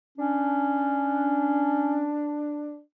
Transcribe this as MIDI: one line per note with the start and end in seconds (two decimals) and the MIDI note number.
0.18 2.09 61
0.18 2.79 62